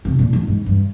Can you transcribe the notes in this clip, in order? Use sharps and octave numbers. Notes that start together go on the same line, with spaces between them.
C3
A#2
A2
G#2
G2